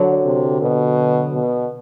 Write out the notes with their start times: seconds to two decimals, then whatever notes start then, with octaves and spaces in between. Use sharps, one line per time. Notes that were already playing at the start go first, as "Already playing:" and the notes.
Already playing: D3 F#3
0.25 C3
0.61 B2
1.33 B2